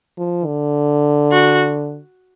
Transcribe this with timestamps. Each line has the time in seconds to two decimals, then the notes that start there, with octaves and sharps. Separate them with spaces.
0.18 F3
0.46 D3
1.31 F#4